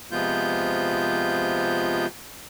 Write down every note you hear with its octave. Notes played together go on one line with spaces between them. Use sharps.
C3 F3 G#3 B3 F4 G6